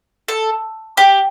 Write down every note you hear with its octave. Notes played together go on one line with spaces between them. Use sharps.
A4
G4